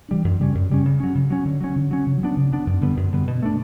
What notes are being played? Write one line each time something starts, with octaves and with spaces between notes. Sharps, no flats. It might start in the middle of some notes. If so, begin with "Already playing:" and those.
E3 G3 D4
F#2
C#3 G3 C#4
F#2
C#3 G3 C#4
C#3
F#3 C#4
C#3
F#3 C#4
D3
F#3 C#4
D3
F#3 C#4
C#3
F#3 B3 D4
C#3
F#3 B3 D4
F#2
D3 G3 B3
F#2
D3 G3 B3
B2
A3 D4